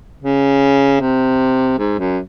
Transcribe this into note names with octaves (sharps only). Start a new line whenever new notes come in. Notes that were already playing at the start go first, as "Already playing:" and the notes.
C#3
C3
G#2
F#2